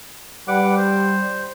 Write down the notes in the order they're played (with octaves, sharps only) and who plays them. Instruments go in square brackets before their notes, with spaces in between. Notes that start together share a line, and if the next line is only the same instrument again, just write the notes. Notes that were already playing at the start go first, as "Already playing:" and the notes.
[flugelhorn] G3 [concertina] B4 F#5 D6
[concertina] C5